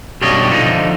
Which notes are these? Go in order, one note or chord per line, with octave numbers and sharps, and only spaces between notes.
B1 F#2 G3 D4 C#5 D#5
D3 F3 D#4